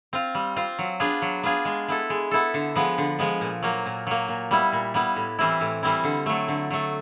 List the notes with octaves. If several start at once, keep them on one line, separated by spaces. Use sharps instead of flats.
C4 F4
G3
C4 F4
F#3
B3 D4 F4 G#4
F#3
B3 D4 F4 G#4
G#3
B3 E4 A4
G#3
B3 E4 A4
D3
F3 G#3 B3
D3
F3 G#3 B3
A#2
F#3 A#3
A#2
F#3 A#3
A#2
G3 B3 E4
A#2
G3 B3 E4
A2
E3 G3 C4 E4
A2
E3 G3 C4 E4
D3
F#3 A3
D3
F#3 A3